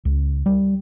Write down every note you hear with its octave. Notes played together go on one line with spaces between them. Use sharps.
C#2
G3